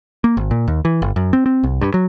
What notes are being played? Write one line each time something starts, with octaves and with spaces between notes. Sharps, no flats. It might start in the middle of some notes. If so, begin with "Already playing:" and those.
A#3
G#1
A#2
D#2
E3
G1
F#2
C4
C4
C2
G2
F#3